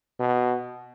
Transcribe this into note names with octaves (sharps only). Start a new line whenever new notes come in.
B2